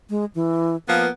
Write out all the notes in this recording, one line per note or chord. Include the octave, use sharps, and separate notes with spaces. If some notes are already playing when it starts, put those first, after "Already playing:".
G#3
E3
F3 A#3 B3 B4